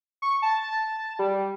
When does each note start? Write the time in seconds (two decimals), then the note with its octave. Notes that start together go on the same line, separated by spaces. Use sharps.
0.22 C#6
0.42 A5
1.19 G3